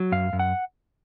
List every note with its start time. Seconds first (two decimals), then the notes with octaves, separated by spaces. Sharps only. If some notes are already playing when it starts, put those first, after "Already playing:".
Already playing: F#3
0.12 F#2 F5
0.33 F#2
0.39 F#5